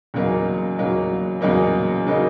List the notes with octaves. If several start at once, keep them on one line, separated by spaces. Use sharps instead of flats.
E2 C#3 F#3 A#3 D#4
E2 C#3 F#3 A#3 D#4
E2 C#3 F#3 A#3 D#4
C#3 F#3 A#3 D#4